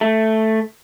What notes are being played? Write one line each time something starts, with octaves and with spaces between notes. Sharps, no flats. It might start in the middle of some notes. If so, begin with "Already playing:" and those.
A3